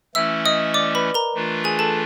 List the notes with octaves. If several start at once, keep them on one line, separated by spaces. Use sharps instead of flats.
E3 A3 C#4 E4 E5 E6
D#5 D#6
D5 D6
B4 B5
A#4 A#5
E3 A3 D4 F4
G#4 G#5
A4 A5